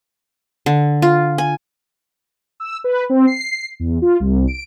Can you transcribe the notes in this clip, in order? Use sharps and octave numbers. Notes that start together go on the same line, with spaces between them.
D3
F4
G#5
E6
B4
C4
C7
E2
F4
C2
D7